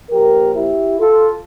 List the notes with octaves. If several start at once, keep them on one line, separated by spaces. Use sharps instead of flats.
A#2 F3 G4 A#4
E4 G4
F4 A4